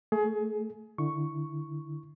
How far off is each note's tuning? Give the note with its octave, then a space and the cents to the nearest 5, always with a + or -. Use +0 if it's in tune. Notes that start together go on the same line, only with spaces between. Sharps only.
A3 +10 G#4 +25
D3 +15 E4 +0 C#6 +0